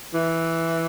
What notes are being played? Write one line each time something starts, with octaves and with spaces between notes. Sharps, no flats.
E3